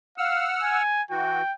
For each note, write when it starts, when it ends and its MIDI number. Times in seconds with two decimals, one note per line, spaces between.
0.18 0.47 77
0.18 0.82 78
0.18 0.82 88
0.18 0.82 89
0.62 1.02 80
1.10 1.42 52
1.10 1.42 66
1.10 1.53 79